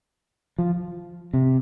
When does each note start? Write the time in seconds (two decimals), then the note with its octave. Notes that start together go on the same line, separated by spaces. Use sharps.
0.59 F3
1.34 C3